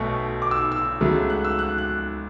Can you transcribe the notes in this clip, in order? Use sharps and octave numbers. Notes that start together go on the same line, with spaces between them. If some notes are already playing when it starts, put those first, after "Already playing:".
Already playing: B1 B2 A3 C#6
D6
E6
E6
C#2 C#3 F#3 A3
F#6
E6
F#6
F#6